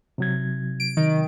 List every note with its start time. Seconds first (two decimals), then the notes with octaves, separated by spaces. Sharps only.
0.18 C3 F#3 G#6
0.80 D7
0.97 D#3